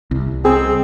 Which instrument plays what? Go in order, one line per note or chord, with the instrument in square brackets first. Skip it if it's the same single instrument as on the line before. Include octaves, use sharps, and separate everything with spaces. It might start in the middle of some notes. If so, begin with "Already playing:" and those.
[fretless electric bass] C2
[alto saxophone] C4 [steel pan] G#4